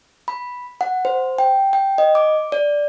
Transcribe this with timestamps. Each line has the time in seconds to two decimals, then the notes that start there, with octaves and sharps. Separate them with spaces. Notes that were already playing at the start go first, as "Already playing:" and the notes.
0.28 B5
0.81 F#5
1.05 C5
1.38 G5
1.73 G5
1.98 D#5
2.15 D6
2.52 D5